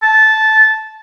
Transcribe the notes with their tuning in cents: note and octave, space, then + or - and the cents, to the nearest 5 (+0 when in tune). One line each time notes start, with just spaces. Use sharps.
A5 -10